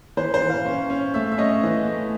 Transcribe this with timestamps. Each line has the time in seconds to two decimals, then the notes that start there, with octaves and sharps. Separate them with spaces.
0.17 E3 C5
0.34 C5
0.42 E3
0.49 F5
0.66 C#4
0.90 C#4
1.14 A3 E5
1.32 E5
1.38 C#4 D#5
1.63 E3
1.87 A3